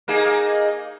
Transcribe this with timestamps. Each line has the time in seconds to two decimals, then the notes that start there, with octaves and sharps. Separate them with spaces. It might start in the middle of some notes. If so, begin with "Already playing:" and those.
0.08 A#3 D#4 G#4